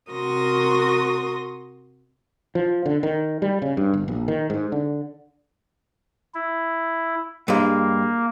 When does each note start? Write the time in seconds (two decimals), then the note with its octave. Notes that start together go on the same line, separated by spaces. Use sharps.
0.12 C3 F#4 A#4 C6 D#6 A#6
2.55 F3
2.86 D3
3.03 D#3
3.42 G3
3.62 C#3
3.77 G2
3.94 G1
4.08 A#1
4.28 D#3
4.50 G#2
4.72 D3
6.34 E4
7.48 G2 G#3 A#3